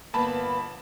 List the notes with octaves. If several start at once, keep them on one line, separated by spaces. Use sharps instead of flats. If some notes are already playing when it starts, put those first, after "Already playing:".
G1 A#3 B3 A5 B5